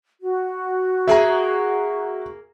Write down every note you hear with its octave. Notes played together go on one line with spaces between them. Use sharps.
F#4
A#3 G#4 E5 A#5